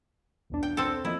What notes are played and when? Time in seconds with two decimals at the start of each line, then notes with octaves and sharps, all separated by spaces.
0.50 B1 E2 D4
0.63 G5
0.77 C4 A4
1.05 F3 A#3 E4 D#5